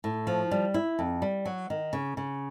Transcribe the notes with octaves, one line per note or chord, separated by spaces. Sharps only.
A2
F3
G3
E4
F2
G3
F#3
D#3
C#3
C#3